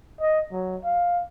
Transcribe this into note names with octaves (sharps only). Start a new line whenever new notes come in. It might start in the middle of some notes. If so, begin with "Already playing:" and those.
D#5
F#3
F5